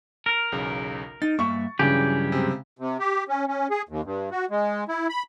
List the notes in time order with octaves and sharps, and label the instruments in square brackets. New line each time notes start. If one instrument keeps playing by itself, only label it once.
[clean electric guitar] A#4
[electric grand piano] B1 E2 C#3
[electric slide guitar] D#4 [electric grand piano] A6
[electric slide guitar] G2 A#3 E5 [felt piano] C#6
[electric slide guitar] G2 F#3 G#4 [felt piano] C#3 [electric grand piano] E3 D4 [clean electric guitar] G4
[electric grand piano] C3 G#3 C4
[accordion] C3
G4
C#4
C#4
G#4
D#2
G2
F#4
G#3
E4
B5